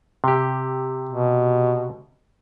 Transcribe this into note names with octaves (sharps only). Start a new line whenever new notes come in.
C3 G4
B2